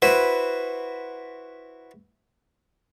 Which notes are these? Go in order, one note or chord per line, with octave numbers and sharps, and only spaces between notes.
E4 F#4 B4 C5